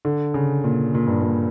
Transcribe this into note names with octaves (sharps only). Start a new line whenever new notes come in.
D3
C#3
A#2
A#2
G2
A#2